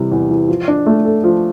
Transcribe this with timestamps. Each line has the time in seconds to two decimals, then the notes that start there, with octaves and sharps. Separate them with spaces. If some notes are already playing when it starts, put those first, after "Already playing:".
Already playing: C3 E3 G3
0.12 E2
0.30 E3
0.48 F3
0.68 D4
0.86 A3
1.05 A4
1.24 F3